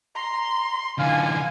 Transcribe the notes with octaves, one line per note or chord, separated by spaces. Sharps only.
A#5 C6
D3 E3 F5 G#5